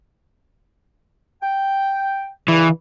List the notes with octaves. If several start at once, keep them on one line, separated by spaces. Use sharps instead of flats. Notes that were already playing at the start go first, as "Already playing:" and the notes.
G5
G2 C#3 E3